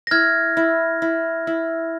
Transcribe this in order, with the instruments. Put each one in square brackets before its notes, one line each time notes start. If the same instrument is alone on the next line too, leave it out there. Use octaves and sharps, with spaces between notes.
[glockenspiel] A#6
[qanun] E4 [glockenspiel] F6 G#6
[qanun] E4
E4
E4